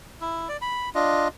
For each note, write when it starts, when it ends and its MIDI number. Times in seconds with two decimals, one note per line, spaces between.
0.21 0.48 64
0.49 0.57 74
0.62 0.89 83
0.95 1.28 62
0.95 1.28 65
0.95 1.28 75